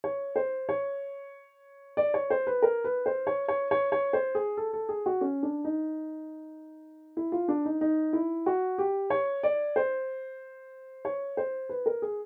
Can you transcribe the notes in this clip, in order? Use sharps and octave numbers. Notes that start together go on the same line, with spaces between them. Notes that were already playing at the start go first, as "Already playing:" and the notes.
C#5
C5
C#5
D5
C#5
C5
B4
A#4
B4
C5
C#5
C#5
C#5
C#5
C5
G#4
A4
A4
G#4
F#4
C#4
D4
D#4
E4
F4
D4
D#4
D#4
E4
F#4
G4
C#5
D5
C5
C#5
C5
B4
A#4
G#4